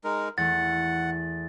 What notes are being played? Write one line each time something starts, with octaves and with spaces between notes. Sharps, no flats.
G#3 D#4 A#4
E2 A3 F#5 A6